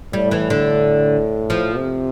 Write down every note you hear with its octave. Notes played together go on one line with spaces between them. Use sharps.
A2 G3
E3
D3
F3
C3